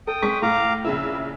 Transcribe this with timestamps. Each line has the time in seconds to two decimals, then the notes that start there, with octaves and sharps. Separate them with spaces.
0.07 A4 G5 D#6
0.22 G#3 C#6 B6
0.42 A2 F5 A#5 D6
0.85 A#1 C#3 E4 E6